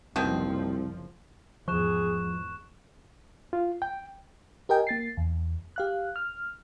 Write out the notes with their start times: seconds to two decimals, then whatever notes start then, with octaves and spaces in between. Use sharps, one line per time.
0.16 F#1 C2 B2 D#3 F3 C4
1.68 E2 G#2 F3 G#4 C#6 F#6 E7
3.53 F4
3.82 G5
4.69 G4 A#4 D#5 G5 G#5
4.87 A#3 A6 C7
5.17 E2
5.76 G4 F5 F#6
6.16 F6